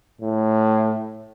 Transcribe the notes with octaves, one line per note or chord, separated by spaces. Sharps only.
A2